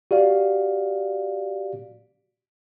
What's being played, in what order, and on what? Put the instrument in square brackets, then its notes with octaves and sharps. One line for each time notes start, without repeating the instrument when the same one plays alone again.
[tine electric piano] F#4 G4 D5 F5